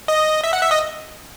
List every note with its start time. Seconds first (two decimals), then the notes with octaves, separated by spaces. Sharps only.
0.08 D#5
0.44 E5
0.53 F#5
0.61 E5
0.71 D#5